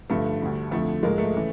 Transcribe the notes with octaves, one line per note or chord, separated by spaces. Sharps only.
G2 D3 F3 A3
D2 D3 G3
F2 D3 F3 A3
G#2 F3 G#3 A#3
A3
C#3 E3